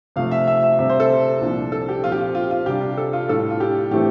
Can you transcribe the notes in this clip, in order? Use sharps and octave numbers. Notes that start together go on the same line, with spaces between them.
C3 F3 A3 F5
E5
E5
E5
C3 G3 C4 E5
C5
A4
C2 A#2 F3 A#3 D4
A4
G4
A#2 F3 C4 F4
G4
F4
F4
F4
C3 G3 D4 G4
A4
F4
A2 G3 D4 A4
F4
G4
A2 E3 A3 C4 G4